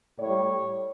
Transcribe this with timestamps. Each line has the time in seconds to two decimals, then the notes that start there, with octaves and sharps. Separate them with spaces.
0.17 A2 C#5
0.22 G3